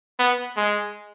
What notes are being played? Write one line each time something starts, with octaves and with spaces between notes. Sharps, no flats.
B3
G#3